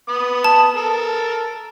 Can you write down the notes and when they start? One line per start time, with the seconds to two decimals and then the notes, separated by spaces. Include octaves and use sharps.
0.08 B3 D#6
0.44 A5
0.76 A4 A#4